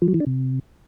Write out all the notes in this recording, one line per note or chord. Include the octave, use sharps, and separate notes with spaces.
F3
F#3
E3
D4
C3